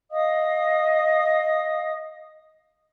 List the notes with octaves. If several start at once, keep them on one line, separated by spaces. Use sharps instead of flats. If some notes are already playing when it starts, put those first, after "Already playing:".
D#5 F5 D#6